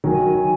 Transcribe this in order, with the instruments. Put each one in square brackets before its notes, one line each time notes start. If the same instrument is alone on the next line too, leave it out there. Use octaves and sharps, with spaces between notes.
[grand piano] D#3 F#3 [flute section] G#5